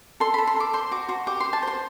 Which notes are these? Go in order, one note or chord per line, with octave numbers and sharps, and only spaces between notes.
A4 C6
B5
A4
C6
A4 D6
C5 C6
F#4 D6
F#4 C6
G4 D6
C6
C5
A5
C5
C6